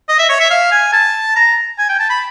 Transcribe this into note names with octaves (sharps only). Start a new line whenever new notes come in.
D#5
E5
C#5
E5
F5
G#5
A5
A#5
G#5
G5
A5
B5